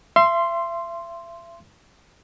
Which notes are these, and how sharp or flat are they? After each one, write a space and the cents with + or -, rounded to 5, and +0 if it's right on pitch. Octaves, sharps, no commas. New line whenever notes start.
E5 +40 C6 +0